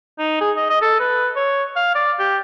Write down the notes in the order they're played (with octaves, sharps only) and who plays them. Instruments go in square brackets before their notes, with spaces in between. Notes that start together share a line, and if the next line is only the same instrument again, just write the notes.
[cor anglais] D#4
G#4
D#5
D#5
A4
B4
C#5
F5
D5
G4